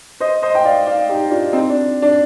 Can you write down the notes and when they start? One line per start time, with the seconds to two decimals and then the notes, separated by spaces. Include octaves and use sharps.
0.20 C5 D#5
0.42 C5 D#5
0.55 G5
0.64 D5 F5
0.87 D5 F5
1.09 D#4 G4
1.31 D4 F4
1.53 C4 D#4
1.70 D4
2.02 D4